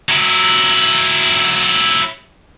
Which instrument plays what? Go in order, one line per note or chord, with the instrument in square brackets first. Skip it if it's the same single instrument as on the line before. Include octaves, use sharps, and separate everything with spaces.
[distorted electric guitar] F#3 E4